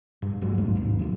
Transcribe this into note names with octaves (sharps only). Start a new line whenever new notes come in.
G2
A1 F#3 G#3
G#1 D#2 G#2
D#2 G#2
D2 B2 F#3